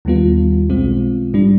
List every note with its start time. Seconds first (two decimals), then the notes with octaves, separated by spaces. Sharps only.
0.05 D#2 D#3 G3 B3 F4
0.69 B1 B2 G#3 C4 F4
1.34 G#2 G3 D4